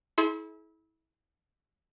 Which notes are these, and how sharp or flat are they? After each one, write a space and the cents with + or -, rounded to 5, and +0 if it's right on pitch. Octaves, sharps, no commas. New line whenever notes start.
E4 -30 G#4 +45 C6 +0